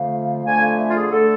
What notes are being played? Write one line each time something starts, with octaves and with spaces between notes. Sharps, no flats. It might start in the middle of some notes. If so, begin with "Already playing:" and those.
Already playing: F2 D3 A3 F5
F2 D3 A3 G#5
F5
E5
F4
G#4
D3 A3 A4